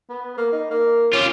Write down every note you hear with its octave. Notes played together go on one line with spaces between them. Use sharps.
B3
A#3
D#4
A#3
C#4 F4 G4